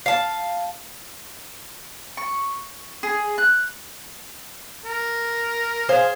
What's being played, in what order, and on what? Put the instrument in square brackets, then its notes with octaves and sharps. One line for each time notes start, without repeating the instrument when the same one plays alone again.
[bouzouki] F5 A5
[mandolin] C#6
G#4
F#6
[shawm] A#4
[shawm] G#4 [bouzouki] C5 F5 G#5